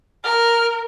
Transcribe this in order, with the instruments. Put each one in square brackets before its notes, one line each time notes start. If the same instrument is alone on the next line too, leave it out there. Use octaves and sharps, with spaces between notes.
[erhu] A#4 [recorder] F6